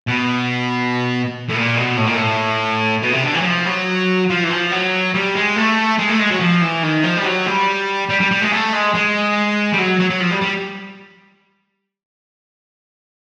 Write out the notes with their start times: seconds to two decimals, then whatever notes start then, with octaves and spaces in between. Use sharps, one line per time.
0.07 B2
1.49 A2
1.54 A#2
1.76 B2
1.97 A2
2.07 A#2
2.15 A2
3.02 B2
3.13 C3
3.24 D3
3.34 E3
3.41 F#3
3.46 F3
3.66 F#3
4.30 F3
4.43 E3
4.50 F3
4.72 F#3
5.14 G3
5.35 G#3
5.56 A3
5.99 G#3
6.09 A3
6.20 G#3
6.30 F#3
6.40 F3
6.62 E3
6.83 D#3
7.04 F3
7.17 G3
7.25 F#3
7.46 G3
8.09 G3
8.20 G3
8.31 G3
8.41 G#3
8.52 A3
8.73 G#3
8.94 G#3
9.73 G3
9.78 F#3
10.00 F#3
10.10 F#3
10.21 F3
10.31 G3
10.41 G3